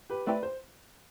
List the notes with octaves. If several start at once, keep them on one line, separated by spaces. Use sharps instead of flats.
G4 B4
A3 C4 E4 G4 B4 D5
C5